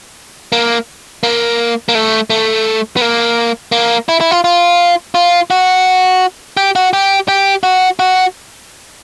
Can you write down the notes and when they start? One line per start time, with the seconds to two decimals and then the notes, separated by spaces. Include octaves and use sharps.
0.52 A#3
1.23 A#3
1.89 A#3
1.95 A3
2.30 A3
2.97 B3
3.01 A#3
3.72 A#3
4.09 E4
4.21 E4
4.31 F4
4.44 F4
5.15 F4
5.50 F#4
6.57 G4
6.76 F#4
6.93 G4
7.28 G4
7.63 F#4
7.99 F#4